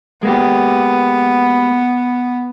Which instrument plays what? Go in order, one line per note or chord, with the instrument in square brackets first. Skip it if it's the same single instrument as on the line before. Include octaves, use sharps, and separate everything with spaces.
[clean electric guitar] G#3 A#3 G4 [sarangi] B3